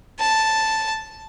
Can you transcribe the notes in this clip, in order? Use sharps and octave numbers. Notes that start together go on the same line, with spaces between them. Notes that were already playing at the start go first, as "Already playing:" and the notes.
A5